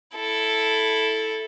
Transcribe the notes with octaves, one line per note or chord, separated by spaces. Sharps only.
E4 A4